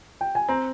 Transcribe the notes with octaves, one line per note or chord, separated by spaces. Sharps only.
G5
G#5
C4 A#5